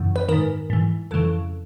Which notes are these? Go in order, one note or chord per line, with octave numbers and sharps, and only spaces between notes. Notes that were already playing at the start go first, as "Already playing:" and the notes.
Already playing: F#2 C#3 E3
B4
G#2 D#3 A#4
G#2 E3
F2 C#3 E3 A4